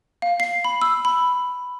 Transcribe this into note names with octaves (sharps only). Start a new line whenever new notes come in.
F5
C7
B5
E6
B5